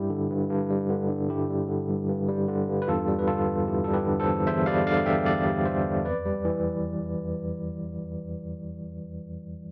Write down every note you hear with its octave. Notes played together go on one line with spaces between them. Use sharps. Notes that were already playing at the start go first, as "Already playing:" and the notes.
Already playing: G2 G3 E4 G4
D3
G2
G2
G3
D3
G2
G2 E4 G4
G3
D3
G2
G2
G3
D3
G2
B4
E2 F4 A4
G3
B4
D3 F4 A4
E2
E2 E4 G4
G3 A4
G4 B4
D3
A4 C5
E2
E2 C5 E5
G3 D5 F5
D3 D5 F5
E2 E5 G5
E2 D5 F5
G3
D3 C5 E5
E2
F2 B4 D5
G3
E3